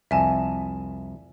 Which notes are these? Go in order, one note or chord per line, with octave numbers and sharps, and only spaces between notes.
C2 F2 E5 G#5 A5